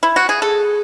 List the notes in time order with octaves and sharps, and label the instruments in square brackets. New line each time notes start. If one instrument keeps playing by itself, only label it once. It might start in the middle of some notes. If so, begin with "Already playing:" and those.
[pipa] E4
F#4
G#4
[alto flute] G#4 [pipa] A4